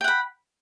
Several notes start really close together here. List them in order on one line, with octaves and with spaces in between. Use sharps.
G5 F#5 B5